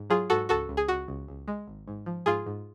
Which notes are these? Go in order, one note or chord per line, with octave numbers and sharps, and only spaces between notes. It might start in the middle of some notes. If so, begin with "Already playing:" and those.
Already playing: G#2
F#3 F4 G#4
G#2 F#4 A4
C#2 F#4 A4
C#2
G#4
C#2 F#4
C#2
C#2
G#3
G#1
G#2
F3
G#2 F4 G#4
G#2